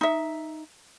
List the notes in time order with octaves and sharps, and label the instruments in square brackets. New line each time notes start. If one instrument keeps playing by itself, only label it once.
[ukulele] D#4 E5